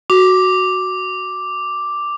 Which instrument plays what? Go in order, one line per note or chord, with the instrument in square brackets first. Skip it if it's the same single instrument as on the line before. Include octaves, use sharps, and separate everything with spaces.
[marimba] F#4 [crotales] D6